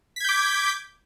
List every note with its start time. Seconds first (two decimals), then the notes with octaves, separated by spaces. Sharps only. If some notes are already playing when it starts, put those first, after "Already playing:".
0.16 B6
0.20 G#6
0.25 G6
0.29 D6